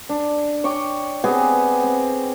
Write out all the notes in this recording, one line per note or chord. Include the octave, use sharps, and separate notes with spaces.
D4
C#5 G5 C#6 D6
B3 C4 G4 G#4
C4